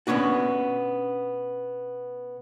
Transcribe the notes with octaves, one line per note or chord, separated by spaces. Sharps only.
B2 B3 C#4 D4 F#4